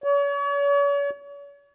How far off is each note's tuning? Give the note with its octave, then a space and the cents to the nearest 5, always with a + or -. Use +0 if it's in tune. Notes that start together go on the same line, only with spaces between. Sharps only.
C#5 +40